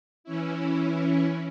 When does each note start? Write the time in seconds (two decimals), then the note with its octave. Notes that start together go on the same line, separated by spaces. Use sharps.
0.24 E3 C#4 E4